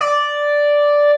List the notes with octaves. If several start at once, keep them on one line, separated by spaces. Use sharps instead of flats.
D5